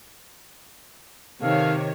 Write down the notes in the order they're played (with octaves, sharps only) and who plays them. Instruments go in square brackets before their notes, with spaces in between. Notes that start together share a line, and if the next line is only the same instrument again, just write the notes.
[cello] C3 [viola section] D#3 C#5 [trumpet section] A4 F5